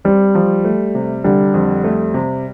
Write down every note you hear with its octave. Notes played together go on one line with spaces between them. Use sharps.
G3 C4
F3
A3
C3
D3 G3
F2
A3
C3